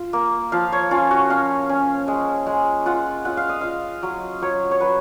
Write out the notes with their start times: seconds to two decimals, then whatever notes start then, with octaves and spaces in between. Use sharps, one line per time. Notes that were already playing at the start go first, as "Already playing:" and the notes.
Already playing: F4
0.13 A#3
0.52 F3 F5
0.72 C#5
0.91 C#4 F4
1.11 F#4
1.30 C#4 F5
1.69 C#4
2.08 G#3
2.46 G#3
2.86 F4 F#5
3.25 F4 F#5
3.37 F5
3.49 D#5
3.61 F4 F5
4.03 F#3
4.42 F#3 C#5
4.71 C#5
4.81 F#3 B4